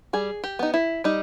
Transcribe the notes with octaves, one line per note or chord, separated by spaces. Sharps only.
G3 G#4
G4
B3 D#4
E4
G3 D#4